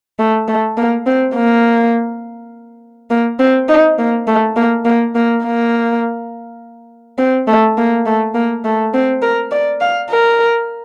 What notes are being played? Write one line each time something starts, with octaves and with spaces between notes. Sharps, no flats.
A3
A3
A#3
C4
A#3
A#3
C4
D#4
A#3
A3
A#3
A#3
A#3
A#3
C4
A3
A#3
A3
A#3
A3
C4
A#4
D5
F5
A#4